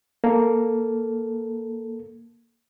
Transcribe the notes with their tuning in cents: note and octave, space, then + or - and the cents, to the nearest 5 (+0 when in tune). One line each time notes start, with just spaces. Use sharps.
A#3 +0 A4 +0